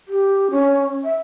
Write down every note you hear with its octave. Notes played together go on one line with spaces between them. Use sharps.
G4
C#4
E5